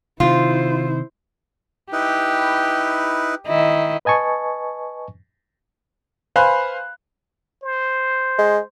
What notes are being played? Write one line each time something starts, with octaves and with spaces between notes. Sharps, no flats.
C3 D#3 E4 F4 C5
D#4 E4 G4 B4
D#3 E4 D#5
B4 D#5 G#5 A5 C#6
B4 C5 F5 G#5 B5 F#6
C5
G#3